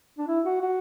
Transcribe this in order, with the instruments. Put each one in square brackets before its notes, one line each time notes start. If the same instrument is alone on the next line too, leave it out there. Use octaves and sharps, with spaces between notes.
[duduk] D4
E4
F#4
F#4